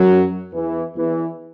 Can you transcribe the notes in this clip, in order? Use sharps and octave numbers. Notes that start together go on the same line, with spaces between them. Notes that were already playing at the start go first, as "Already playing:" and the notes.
Already playing: F#2 F#3
E2 E3
E2 E3